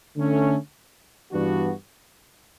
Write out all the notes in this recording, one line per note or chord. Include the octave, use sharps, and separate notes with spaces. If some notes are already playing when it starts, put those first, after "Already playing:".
D3 A3 C#4
G2 E3 B3 D4 F#4